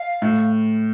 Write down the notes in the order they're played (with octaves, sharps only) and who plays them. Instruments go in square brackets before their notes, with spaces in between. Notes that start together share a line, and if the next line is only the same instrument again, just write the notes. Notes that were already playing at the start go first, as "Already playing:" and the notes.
Already playing: [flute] F5
[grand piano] A2